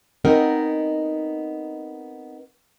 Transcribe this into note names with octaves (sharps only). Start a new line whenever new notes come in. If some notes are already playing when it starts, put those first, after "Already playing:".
B3 C4 D#4 A#4 D#5 F#5